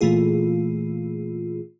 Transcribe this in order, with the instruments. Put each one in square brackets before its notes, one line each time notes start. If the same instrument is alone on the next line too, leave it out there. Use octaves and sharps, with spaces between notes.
[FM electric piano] A#2 E3 A3 F4 G#4